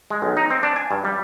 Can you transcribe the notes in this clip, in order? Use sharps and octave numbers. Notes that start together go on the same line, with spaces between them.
G#3
B1
D#4
C4
D4
G#5
G2
G3